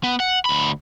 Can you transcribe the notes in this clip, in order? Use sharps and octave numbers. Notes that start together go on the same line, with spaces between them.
B3
F#5
D2 B5